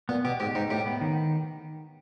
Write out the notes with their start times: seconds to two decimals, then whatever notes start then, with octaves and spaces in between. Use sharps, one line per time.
0.09 A#2 B3
0.25 B2 G4
0.40 G#2 G4
0.55 G#2 D#4
0.71 A2 G4
0.86 B3
1.01 D#3